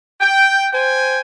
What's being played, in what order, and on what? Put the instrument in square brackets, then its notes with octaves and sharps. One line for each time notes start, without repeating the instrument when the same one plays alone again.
[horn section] G5
C5 G5 G#5